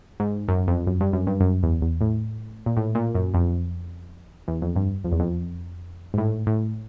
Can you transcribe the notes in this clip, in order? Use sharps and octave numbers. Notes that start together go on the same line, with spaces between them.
G#2
F#2
F2
F#2
G2
F#2
G2
F#2
E2
E2
A2
A#2
A2
A#2
F#2
F2
E2
F2
G2
F2
E2
F2
G#2
A2
A2